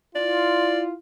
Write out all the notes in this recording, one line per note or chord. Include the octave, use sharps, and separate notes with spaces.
E4 F4 D5